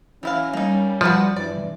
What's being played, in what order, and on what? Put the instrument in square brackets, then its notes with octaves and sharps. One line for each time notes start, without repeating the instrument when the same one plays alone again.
[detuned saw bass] E3 [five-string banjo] F#3 E4 F5 [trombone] C#4
[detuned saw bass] G3 [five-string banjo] A#3 D#4
[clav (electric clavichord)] F3 [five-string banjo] F#4 B4 D5
[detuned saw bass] G2 [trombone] E3 [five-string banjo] D5